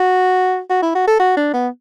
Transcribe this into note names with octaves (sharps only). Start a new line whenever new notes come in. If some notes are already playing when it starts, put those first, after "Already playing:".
Already playing: F#4
F#4
E4
F#4
A4
F#4
D4
B3